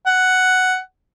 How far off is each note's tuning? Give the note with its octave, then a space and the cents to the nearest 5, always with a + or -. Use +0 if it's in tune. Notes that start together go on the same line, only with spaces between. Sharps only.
F#5 +5